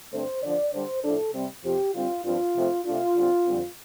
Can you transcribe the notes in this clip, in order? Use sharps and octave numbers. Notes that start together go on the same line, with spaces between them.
G2 D3 A3 C4 C5
D3 F3 D4 D5
D3 G3 D4 C5
A2 F3 D4 A4
C3 G3 C4
F2 C3 F3 C4 G4
D3 G3 C4 F4
G2 F3 C4 F4
C3 F3 A3 C4
C3 A3 D4 F4
D3 G3 C4
F2 D3 G3 C4